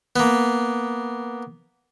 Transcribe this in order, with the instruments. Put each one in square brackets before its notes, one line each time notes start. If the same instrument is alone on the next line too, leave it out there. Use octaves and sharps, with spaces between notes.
[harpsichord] A#3 B3